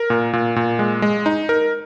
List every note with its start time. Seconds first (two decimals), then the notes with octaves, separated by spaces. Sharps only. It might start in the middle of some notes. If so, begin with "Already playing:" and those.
Already playing: A#4
0.10 A#2
0.33 A#2
0.56 A#2
0.79 G#3
1.02 G#3
1.26 D#4
1.49 A#4